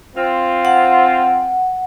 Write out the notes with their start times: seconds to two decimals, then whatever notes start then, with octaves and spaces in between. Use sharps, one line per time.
0.16 C4 F4
0.65 F#5